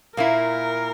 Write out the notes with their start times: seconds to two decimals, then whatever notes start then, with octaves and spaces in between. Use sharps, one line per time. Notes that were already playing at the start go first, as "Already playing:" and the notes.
0.16 A#2 A#3 E4 A#4